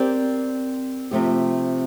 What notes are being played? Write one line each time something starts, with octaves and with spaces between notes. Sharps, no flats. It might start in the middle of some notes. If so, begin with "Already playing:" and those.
Already playing: C4 G4 A#4 D5
C3 F3 A3 C4 G4